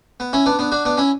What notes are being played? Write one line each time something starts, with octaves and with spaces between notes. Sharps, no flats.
B3
C#4 E4
B3 D4
B3 D4
D4 F#4
B3 D4
C#4 E4